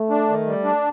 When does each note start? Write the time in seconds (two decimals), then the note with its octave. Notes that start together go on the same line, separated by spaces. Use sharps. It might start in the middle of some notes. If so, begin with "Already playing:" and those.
Already playing: A3
0.10 D4
0.29 D#3
0.47 G3
0.64 D4